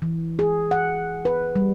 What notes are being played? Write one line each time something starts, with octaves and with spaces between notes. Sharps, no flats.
E3
G#4
F#5
B4
G3